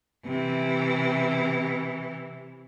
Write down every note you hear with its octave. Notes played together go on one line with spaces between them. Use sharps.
C3 E3